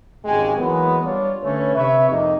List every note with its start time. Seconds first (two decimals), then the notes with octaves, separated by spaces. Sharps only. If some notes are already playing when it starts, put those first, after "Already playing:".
0.25 G#1 D#2 C#3 G#3 G5 G#5
0.57 E3 F#3 G#3 A#3 B3
1.03 G3 D4 F4 C#5
1.43 D3 A3 C#4 B4 C#5
1.75 C3 B4 C#5 E5
2.09 F2 C3 A#3 D#4